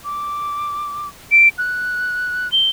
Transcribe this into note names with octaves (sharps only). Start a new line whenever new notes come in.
D6
D7
F#6
G7